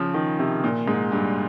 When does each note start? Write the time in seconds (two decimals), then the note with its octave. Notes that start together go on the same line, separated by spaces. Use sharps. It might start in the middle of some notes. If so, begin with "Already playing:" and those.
Already playing: C#3 F3
0.14 D#3
0.39 C3
0.64 A#2
0.88 G#2
1.12 G2